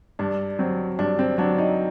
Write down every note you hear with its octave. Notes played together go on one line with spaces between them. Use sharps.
G2 D4
F#3 C4
G2 D4
C4
F#3 D4
D#4